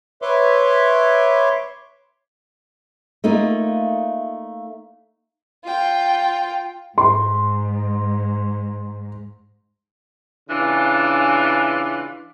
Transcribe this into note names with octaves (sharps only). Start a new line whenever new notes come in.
B4 C#5 E5 C6 D6
A3 A#3 D#4 F4
F4 G5
G#2 C6
C#3 E3 D4 F4